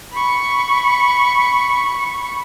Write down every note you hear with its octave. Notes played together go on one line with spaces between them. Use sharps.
B5 C#6